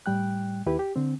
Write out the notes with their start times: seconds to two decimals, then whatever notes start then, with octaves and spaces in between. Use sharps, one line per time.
0.06 A2 G3 G5 F#6
0.66 D#2 E4 G4 B4
0.79 G4
0.96 D3 C4